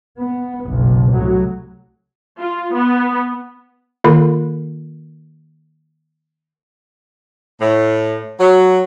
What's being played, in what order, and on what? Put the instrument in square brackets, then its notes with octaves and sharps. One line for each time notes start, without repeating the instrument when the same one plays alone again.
[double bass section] B3
F#1 B1
C2 A2 F#3
[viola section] F4
B3
[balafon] D#3 A#3 F4 A4 A#4 B5
[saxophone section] A2
F#3